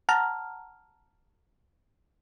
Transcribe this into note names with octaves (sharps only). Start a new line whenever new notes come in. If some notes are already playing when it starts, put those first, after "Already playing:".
F#5 A5 A#5 F6